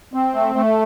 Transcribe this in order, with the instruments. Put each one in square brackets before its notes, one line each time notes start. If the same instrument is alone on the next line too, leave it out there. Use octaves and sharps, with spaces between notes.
[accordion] C4
A3
A3